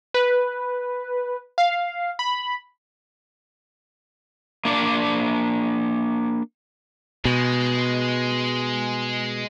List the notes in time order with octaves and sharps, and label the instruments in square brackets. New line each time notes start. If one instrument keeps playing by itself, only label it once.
[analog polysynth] B4
F5
B5
[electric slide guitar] A#3 D4 D5
[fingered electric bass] B2 [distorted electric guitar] G#3